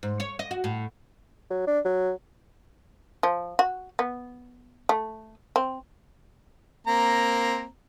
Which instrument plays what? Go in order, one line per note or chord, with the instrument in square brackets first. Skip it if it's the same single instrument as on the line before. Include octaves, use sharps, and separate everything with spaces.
[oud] G#2
C#5
D#5
F#4
A2
[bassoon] F#3
D4
F#3
[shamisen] F3
F#4
B3
A3
C4
[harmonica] A#3 C4 A#5